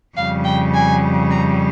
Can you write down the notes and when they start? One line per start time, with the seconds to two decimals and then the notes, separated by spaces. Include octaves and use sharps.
0.16 F2 C#3 G3 F5
0.44 G5
0.74 G#5
1.31 A#5